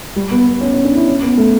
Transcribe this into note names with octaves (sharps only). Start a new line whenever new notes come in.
G3
B3
B3
C#4
C#4
D4
E4
C#4
B3
A3